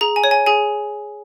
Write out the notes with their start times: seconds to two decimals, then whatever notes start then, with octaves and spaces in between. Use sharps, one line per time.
0.01 G#4 A#5
0.16 G#5
0.24 C#5
0.31 G#5
0.46 G#4 G#5